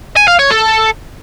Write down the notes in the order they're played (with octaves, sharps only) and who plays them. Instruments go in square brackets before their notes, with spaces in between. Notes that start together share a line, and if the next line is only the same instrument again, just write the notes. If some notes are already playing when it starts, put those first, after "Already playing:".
[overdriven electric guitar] G#5
F5
C#5
A4